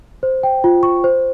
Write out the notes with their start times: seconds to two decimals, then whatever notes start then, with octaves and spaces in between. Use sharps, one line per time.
0.23 C5
0.43 G5
0.64 F4
0.83 C#6
1.04 C5